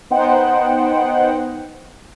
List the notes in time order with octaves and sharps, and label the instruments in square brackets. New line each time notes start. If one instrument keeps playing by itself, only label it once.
[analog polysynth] B3 D#4 C5 F#5 G5